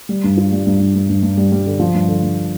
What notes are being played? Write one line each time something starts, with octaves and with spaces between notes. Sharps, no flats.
G3
G2
F4
G3
G2
G2
G2
G2
G2
G3
G3
D3
F3
G2
D3
G2